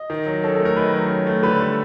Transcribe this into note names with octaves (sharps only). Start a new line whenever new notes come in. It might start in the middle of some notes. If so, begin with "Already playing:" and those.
Already playing: D#5
D#3
F#3
C#4 A4
A4
A3
A#4
D#3 B4
F#3
C#4
A3
D3 B4
G3